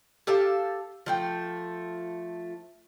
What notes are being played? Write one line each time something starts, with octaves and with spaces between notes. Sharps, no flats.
G4 A4 F5 A5
F3 A3 G5